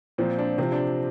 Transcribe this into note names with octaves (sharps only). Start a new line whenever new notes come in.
A#2 F3 C4
D4
C3 F3 C4
D4